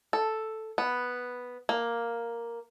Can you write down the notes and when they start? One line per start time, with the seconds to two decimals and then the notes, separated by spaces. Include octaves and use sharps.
0.13 A4
0.78 B3
1.69 A#3